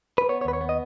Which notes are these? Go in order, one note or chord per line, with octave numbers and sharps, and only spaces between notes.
B4
B3 C#5
C#5
D#2 B4
C#5
B3
D#5